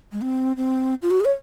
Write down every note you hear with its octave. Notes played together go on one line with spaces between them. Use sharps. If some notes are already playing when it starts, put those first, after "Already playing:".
G#3
C4
C4
F4
F#4
G#4
C#5